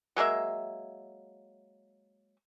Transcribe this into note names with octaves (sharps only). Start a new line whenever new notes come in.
F#3 G#3 A#3 E5